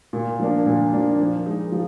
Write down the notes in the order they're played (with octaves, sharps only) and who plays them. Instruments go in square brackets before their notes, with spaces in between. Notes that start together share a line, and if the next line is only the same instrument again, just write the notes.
[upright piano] A#2
F3 A#3 D4
A#2
F3 A#3 D4
F3
G#3 D#4
F3